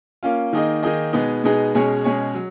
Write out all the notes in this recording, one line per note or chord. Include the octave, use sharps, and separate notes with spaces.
A#3 C#4 F4
D#3 A#3 D#4 G#4 D#5
D#3 A#3 D#4 G#4 D#5
B2 G#3 B3 D#4 G#4
B2 G#3 B3 D#4 G#4
B2 G#3 C#4 G#4 C#5
B2 G#3 C#4 G#4 C#5
F#3